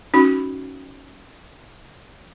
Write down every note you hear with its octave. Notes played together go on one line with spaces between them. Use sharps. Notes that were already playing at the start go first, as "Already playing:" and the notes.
C#4 D#4 F#4 B5